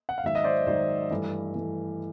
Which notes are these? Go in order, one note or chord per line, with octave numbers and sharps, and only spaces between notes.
F#5
F5
G#2 D#3 F#3 E5
D#5
C5 D5
G#2 D#3 F#3 C5 D5
G2 E3 A3
G2 E3 A3